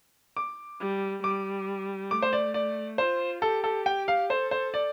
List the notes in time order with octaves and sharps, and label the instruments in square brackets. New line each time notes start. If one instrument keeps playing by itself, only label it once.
[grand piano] D6
[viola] G3
[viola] G3 [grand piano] D6
[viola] A3 [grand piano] D6
[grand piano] C5
D5
D5
[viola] F4 [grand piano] C5
[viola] G4 [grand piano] A4
[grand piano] A4
G5
F5
[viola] A4 [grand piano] C5
[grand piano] C5
D5